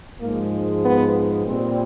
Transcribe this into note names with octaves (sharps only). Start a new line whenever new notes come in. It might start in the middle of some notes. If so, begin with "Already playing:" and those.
G#2 F3 G#3 A#3
B3
A#2 G3 C4